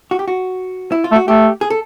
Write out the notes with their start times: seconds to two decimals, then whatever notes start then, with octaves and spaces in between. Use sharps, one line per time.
0.11 F#4
0.19 G4
0.28 F#4
0.92 E4
1.04 F4
1.12 A3
1.16 F#4
1.28 A3 G4
1.61 G#4
1.70 A4